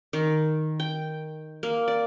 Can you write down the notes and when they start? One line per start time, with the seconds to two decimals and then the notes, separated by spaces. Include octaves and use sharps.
0.13 D#3
0.80 G5
1.63 A#3
1.88 D5